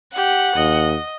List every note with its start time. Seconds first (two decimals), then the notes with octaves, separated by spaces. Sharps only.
0.16 G4 F#5
0.56 D#2 D#5